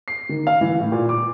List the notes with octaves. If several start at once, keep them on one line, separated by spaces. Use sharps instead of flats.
C7
D#3
F5
E3
A2
A#2
D6